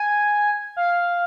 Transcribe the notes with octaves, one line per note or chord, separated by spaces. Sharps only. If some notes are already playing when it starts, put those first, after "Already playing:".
Already playing: G#5
F5